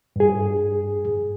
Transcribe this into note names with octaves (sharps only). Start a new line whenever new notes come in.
G2 G#4